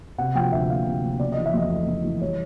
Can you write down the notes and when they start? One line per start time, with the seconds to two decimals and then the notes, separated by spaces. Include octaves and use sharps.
0.18 C3 F#5
0.35 F3 G5
0.52 D2 E5
0.70 A#3 F5
0.86 C3
1.04 F3
1.19 C#3 D5
1.32 D#5
1.37 E3
1.46 E5
1.54 F2 D#5
1.70 A3 D#5
1.87 C#3
2.04 E3
2.21 G3 C#5